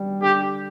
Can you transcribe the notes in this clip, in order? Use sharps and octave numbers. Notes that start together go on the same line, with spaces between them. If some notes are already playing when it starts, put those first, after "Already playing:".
Already playing: G3
D3 G4